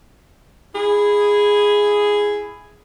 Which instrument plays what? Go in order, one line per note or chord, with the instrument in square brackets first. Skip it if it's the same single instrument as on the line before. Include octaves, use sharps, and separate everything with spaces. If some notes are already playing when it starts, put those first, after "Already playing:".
[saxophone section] E4 G#4